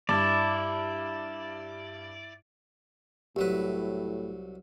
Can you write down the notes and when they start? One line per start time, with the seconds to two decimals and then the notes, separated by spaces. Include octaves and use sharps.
0.09 G2 E4 D5
3.36 C2 A2 F#3 G4 B4